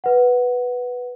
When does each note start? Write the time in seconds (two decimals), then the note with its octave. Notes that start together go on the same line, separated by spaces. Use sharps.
0.04 B4 F#5